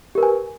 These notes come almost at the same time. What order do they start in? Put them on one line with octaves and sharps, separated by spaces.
G4 A#4 B4 G#5